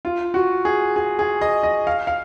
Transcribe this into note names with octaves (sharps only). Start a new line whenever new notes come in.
F4
F#4
G#4
G#4
G#4
D#5
D#5
F5
F5